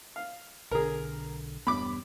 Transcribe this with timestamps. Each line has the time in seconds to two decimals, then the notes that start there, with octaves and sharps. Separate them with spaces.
0.16 F5
0.71 B1 D3 G#4 A#4
1.67 E1 G2 B3 B5 D6